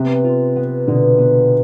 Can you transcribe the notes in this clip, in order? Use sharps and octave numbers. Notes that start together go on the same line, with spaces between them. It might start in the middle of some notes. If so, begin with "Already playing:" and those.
Already playing: C3 B3
F4
B3
B2 D3
B3